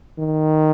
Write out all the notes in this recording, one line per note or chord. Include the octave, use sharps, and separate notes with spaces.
D#3